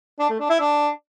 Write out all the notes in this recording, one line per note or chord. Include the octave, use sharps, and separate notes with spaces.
D4
A3
D4
E4
D4